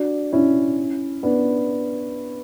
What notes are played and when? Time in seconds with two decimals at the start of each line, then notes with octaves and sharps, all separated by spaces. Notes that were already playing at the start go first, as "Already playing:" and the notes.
Already playing: D4 F#4
0.33 C#4 E4
1.23 B3 D4